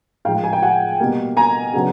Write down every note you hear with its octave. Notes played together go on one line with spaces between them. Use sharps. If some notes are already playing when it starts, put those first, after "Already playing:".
A2 F3 G#3 F5 G5
G#5
G5
F#5 G#5
B2 G3 A#3
G#5 A#5
C#3 F#3 B3 D4